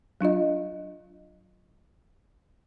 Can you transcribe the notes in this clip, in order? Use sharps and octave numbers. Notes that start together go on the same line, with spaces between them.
F#3 D4 F4 D#5